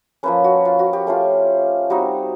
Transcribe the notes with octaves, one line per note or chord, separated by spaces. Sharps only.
F3 A#3 C#4 B4
F#4
F4
F#4
G4
A3 C#4 F4
G3 C4 D#4 F#4